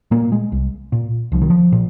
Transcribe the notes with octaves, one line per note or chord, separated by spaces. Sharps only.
A#2 A#3
G#3
C2
A#2
C2 F3
D#3
F3
A#2